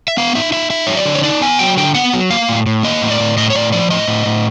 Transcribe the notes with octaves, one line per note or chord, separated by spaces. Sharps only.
E5
B3 F5
D#4 E5
D#4 E5
D#4 E5
F#3 C#5
D5
D3
C#5
D#4 D5
B3 G#5
F#3 G5
D3 G5
B3 F#5
F#3
A#3 F5
A2
A2
A#3 D#5
A2
D5
A2
A2 D#5
C#5
A2 D5
F3 D5
A2 D#5
A2
A2